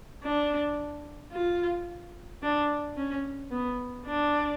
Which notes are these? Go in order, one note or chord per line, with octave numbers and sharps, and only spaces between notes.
D4
F4
D4
C#4
B3
D4